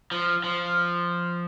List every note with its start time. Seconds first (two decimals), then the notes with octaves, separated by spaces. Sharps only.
0.11 F3
0.44 F3